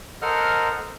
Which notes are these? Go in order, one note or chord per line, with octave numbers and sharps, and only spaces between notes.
A4 A#4 C5 D#5 F#5 F6